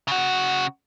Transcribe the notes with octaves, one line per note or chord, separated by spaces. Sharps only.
C#3 F#4